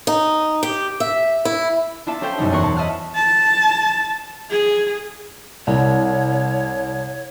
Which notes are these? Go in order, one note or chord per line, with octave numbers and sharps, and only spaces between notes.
D#4
G4
E5
E4
B3 D4 E4 F4 E5 A5
C#4 G4 A4 C5 F5 G5
F#2 B2 G3 D#4
E2 B3 A#4 F#5 C6 C#6
A5
D#5 E5 F#5 A5 F6 F#6
A5
G#4
C2 C#5